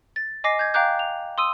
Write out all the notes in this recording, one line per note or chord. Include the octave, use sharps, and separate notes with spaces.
A6
D#5 G#5 D6 A#6 C7
G6 G#6
F5 G5 A#5 D6 F#6 G6
F7
C6 D#6 E6 D#7